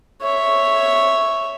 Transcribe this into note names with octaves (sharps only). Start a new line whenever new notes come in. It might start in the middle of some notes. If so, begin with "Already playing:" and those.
C#5 E5